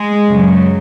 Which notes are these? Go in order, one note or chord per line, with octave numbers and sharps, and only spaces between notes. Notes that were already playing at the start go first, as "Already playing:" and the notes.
Already playing: G#3
F#2 C#3 F#3